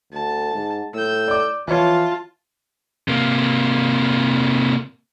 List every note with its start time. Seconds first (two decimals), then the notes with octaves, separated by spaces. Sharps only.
0.13 D2 A5
0.55 G#2
0.94 A2 E6 G6
1.28 D5 D6
1.68 E3 F3 F4 C#5 A5
3.08 C3 A#3